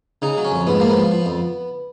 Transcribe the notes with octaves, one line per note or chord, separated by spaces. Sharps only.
C#3 D#4
F#3
C#4
F2
G#2 B3
F3 A#3
B3
F3
F3
F2